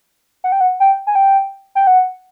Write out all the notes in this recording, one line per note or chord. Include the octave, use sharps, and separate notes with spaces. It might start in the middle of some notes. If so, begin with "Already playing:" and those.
F#5
G5
F#5
G5
G#5
G5
G5
F#5